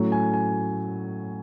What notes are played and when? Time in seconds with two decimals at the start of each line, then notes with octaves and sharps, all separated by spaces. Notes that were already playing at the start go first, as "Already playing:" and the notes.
Already playing: A2 F#3 A3 C#4
0.12 G#5
0.34 G#5